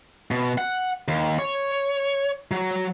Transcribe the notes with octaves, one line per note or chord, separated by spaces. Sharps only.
B2
F#5
D#2
C#5
F#3